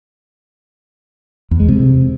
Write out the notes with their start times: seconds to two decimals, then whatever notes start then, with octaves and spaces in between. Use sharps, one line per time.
1.51 E2
1.60 G#3
1.68 C3